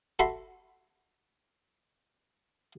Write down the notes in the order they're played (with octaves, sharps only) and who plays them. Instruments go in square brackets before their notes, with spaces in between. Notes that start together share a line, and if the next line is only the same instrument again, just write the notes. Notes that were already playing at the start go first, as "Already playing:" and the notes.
[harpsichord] F#4 A4 E5 B5 C6